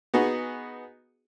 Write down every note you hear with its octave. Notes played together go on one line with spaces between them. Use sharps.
B3 D#4 F#4 G#4